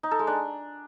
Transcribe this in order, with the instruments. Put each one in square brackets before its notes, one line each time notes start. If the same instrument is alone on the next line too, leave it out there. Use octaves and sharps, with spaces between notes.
[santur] D#4
A4
G#3
D4